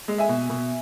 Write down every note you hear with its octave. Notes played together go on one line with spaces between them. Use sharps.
G#3
E5 G#5
B2
B2